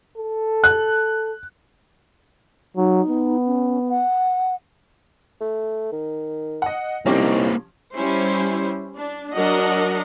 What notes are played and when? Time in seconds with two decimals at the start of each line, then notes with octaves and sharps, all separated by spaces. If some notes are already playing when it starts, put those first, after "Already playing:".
0.17 A4
0.64 F#6
2.77 F#3 D#4
3.09 B3
3.46 C#4
3.88 F#5
5.41 A3
5.92 D#3
6.62 D#5 F#5
7.06 C2 F3 A#3 C4 C#4 D#4 G4
7.95 G3 C#4 E4 C5
8.96 D4
9.36 F#3 D4 A#4 D#5 F#5